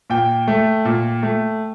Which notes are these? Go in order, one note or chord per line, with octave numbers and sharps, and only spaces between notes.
A#2 G5
A3
A#2
A3